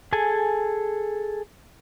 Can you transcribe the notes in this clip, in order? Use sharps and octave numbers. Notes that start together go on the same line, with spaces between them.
G#4 A4 G#5